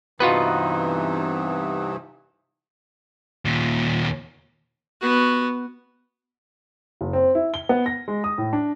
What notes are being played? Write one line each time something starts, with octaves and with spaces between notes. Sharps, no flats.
G2 C3 E3 B3 D#4 F4 F#4 B4
D#2 A#2
B3 F#4
F#1
C4
E4
G7
B3
A#6
G#3
D#6
A2
D4